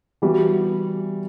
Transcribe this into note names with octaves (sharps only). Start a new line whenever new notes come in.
E3 G3 B3 F#4